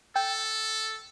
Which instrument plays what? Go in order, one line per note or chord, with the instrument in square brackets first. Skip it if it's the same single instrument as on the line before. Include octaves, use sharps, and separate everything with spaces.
[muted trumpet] A4 [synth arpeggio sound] G5